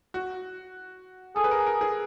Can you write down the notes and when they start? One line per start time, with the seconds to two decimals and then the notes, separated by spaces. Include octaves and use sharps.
0.14 F#4
1.36 G#4 A4
1.44 B4
1.51 A#4
1.66 A#4
1.81 G#4